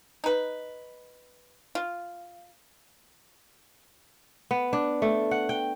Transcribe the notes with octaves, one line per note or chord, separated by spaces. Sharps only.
D#4 B4
F4
B3
D4
A3
F#5
G5